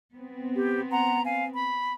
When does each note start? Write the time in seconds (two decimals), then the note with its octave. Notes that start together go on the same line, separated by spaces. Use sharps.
0.14 B3 C4
0.55 G4
0.90 F#5 A#5 C6
1.23 F5 G#5
1.54 B5